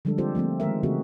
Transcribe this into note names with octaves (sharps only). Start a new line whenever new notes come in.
D3 F3 G3 G#3 D4 A4
C4 F4 G4 A4 C5
F3 A3 A#3 C4
D#3 G#3 A4 A#4 E5
C#3 E3 A3 C4 F#4 G#4